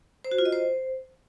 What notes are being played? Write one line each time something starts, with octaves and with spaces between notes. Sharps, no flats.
C5
F#4
F4
D#5
C5